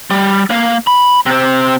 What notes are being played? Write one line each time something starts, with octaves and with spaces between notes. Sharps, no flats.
G3
A#3 F5
B5
C3 C4